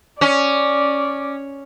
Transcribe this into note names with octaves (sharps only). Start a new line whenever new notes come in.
C#4 D5